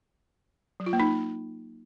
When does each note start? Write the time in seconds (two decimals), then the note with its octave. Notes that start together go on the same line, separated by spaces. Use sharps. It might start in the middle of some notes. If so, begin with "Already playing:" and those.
0.80 F#3
0.86 F4
0.93 A#3
1.00 D#4